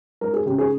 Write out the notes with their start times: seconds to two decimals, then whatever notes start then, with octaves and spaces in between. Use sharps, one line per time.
0.21 G#3 A#4
0.34 G#4
0.46 C#3 G4
0.58 G#4